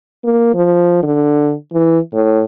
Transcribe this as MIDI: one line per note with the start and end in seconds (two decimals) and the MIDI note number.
0.24 0.54 58
0.55 1.01 53
1.03 1.53 50
1.73 1.99 52
2.14 2.43 45